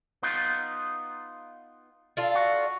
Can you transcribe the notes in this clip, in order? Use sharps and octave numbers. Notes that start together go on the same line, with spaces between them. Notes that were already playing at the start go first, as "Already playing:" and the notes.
B3 D#4 F4
D4 F4 A4
F#4